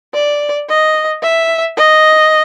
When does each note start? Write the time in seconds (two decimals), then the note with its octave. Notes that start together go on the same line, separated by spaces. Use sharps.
0.14 D5
0.69 D#5
1.22 E5
1.77 D#5